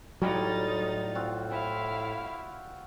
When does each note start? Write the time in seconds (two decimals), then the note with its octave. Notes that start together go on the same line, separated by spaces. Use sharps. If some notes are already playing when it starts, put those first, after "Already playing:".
0.22 A2 F#3 G3 D#4 F4 D#5 A6
1.15 C4 F4 F#4
1.50 C4 E4 F5